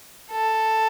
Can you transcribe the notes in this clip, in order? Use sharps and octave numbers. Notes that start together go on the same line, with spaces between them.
A4